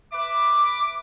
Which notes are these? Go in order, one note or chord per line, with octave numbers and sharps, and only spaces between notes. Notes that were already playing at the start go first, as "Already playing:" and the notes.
B4 E5 B5 D6